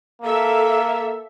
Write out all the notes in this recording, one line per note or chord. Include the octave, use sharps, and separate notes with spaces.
A#3 A4 E5